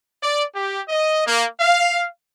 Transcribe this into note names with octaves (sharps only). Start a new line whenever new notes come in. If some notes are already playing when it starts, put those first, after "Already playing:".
D5
G4
D#5
A#3
F5